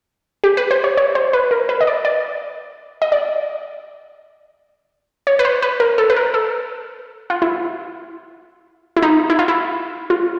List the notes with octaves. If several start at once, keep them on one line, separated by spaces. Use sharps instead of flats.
G4
B4
C5
C#5
C#5
C5
B4
A#4
B4
D#5
D5
D5
D#5
D5
C#5
B4
C5
B4
A#4
A4
B4
A#4
A4
F4
E4
E4
D#4
E4
F4
E4
F4